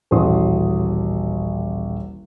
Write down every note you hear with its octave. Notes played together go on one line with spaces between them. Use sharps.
D#1 A1 F#4 C#5 C6 D#6